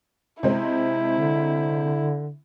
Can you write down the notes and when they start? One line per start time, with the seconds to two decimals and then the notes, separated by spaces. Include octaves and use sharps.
0.43 C3 G#3 C4 E4
1.15 D3